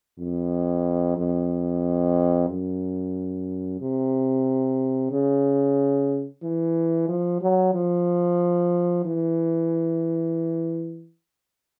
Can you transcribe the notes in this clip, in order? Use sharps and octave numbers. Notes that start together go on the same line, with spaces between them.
F2
F2
F#2
C3
C#3
E3
F3
F#3
F3
E3